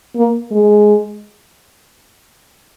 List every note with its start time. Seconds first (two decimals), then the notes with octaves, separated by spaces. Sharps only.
0.16 A#3
0.51 G#3